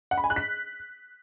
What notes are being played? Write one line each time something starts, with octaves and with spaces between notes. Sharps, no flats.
F#5
B5
G#5
F#6
B6